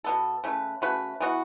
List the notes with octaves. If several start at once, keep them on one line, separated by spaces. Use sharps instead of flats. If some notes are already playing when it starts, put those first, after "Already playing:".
B2 B3 A4
C#3 A3 F#4 B4
C#3 A3 F#4 B4
E3 B3 F#4